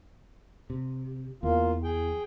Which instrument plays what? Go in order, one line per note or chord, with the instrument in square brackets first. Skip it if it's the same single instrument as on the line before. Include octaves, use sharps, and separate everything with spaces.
[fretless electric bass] C3
[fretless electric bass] E2 [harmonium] A#3 F4
[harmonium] G#4 G5